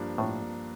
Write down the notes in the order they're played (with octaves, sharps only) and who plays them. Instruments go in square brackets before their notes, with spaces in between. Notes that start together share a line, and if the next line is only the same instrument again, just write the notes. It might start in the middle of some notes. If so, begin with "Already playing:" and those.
Already playing: [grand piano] G2 F3 A#3 D4
[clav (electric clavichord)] A2 [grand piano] F3 A#3 D4